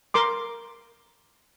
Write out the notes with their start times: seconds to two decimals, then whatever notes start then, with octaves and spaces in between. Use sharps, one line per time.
0.14 A#4 C6 D6